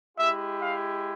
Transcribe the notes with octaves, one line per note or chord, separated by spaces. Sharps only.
G#3 E4 G4 E5
F5